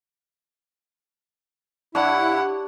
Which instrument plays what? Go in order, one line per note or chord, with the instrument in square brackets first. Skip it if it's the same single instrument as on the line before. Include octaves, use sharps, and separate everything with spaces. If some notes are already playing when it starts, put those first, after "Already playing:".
[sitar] G2 [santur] D4 C#5 [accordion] E4 [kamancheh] F#5